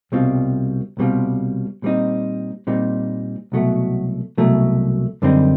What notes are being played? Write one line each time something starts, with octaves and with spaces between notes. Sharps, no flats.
C2 B2 G3 C4 F4
C2 B2 G3 C4 F4
A#2 G3 C4 D#4
A#2 G3 C4 D#4
C2 B2 F#3 A3
C2 B2 F#3 A3
F#2 D3 G3 C4 D#4